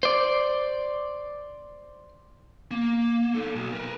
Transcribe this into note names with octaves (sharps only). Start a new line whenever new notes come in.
C5 D5
A#3
D#4 A4
B1
A#4 B4